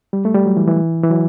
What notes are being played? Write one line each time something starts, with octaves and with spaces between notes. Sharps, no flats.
G3
A3
G3
F#3
E3
E3
E3
F#3